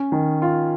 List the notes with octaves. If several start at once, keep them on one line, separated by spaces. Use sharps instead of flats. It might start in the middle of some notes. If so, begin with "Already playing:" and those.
Already playing: C#4
D#3
F4